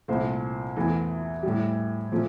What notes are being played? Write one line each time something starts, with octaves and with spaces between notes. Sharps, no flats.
C2 A#2 A3 C5
E2 E3 A3
A2 G3
A#2 F3 A3